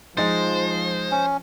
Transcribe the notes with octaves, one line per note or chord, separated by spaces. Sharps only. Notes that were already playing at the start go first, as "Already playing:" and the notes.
F3 G#3 D#4 C5 A6
C#4